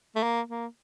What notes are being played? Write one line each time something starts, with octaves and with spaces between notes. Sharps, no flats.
A3
A#3
A#3